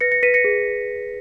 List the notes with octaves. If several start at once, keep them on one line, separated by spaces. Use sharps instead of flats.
B4 A#6 C#7
A#6 C#7
B4 B6 D#7
A#6 C#7
G#4